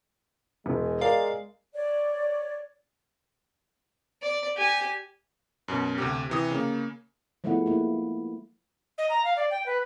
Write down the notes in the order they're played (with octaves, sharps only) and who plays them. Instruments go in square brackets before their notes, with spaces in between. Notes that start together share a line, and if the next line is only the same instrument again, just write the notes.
[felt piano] E1 [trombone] G#3
[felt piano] A#4 D5 [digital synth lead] F5
[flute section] C#5 D5
[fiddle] D5
G4 G#5
[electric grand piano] F#2 B2
D2 C3 G4
C3 E3 D#6
C#3 A#3
[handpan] F3 G#3 A3 B3 E4 F#5
A#3 E4
[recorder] D#5
A#5
F5
D5
G5
B4